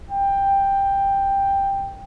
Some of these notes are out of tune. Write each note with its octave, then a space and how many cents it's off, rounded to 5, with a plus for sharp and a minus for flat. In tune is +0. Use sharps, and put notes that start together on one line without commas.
G5 +10